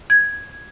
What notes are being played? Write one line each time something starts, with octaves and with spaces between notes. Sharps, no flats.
G#6